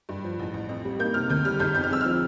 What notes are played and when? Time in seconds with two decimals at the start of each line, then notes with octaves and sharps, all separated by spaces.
0.09 G2
0.24 F3
0.39 A1
0.54 A1
0.69 F2
0.85 G3
0.99 A#3 G6
1.14 C3 F6
1.29 D2 G6
1.45 G3 F6
1.60 G1 G6
1.75 F2 G6
1.84 F6
1.90 F2 E6
2.01 F3 F6